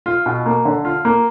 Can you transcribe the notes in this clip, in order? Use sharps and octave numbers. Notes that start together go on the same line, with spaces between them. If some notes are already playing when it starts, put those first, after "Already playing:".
F4
B2
A#3
D3
F4
A#3